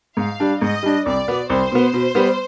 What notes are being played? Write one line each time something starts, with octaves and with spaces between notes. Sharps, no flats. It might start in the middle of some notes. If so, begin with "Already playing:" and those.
G#2 F5
G3 D4
G#2 D#5
G3 D4
C2 D5
B2 B3
C2 C5
B2 B3
B2
G3 B3